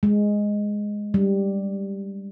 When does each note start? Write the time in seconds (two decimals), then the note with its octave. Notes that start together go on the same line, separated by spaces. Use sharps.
0.03 G#3
1.14 G3